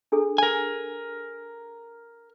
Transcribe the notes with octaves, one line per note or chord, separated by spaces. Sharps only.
D4 G#4 A4
A#4 G#5